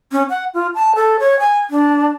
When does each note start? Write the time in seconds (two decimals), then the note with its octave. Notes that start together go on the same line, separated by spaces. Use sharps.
0.12 C#4
0.30 F#5
0.54 F4
0.75 A5
0.95 A4
1.20 C#5
1.39 G#5
1.70 D4